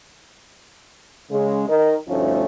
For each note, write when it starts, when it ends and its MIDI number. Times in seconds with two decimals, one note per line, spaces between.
1.31 1.64 49
1.31 1.64 56
1.68 1.97 51
1.68 1.97 70
1.68 1.97 75
2.08 2.45 38
2.08 2.45 43
2.08 2.45 53
2.08 2.45 57
2.08 2.45 61
2.08 2.45 63